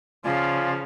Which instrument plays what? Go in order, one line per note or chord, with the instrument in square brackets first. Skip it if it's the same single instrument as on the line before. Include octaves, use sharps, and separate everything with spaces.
[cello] C#3 [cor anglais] F3 [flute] F4 [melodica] D5 G#5